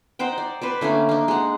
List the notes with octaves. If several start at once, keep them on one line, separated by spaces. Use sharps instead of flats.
D#4 C5 F#5 G5
D5
B4 C5 D5
D3 A3 A#3 C#4
D4 D#4
G#3 F#5